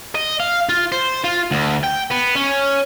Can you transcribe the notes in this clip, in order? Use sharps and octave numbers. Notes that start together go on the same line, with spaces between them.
D#5
F5
F4
C5
F4
D2
G5
B3
C#4